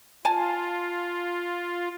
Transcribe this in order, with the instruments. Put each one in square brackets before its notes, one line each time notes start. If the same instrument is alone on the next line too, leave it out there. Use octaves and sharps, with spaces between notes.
[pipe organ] F4 [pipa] G#5 A5